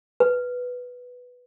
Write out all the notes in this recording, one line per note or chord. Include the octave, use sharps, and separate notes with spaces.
B4